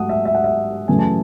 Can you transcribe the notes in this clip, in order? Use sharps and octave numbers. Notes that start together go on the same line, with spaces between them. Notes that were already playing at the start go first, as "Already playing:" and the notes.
Already playing: G#2 F#3 A3 F#5 D#6
E5
E5
F#5
E5
F#2 C#3 E3 A3 G#5
A5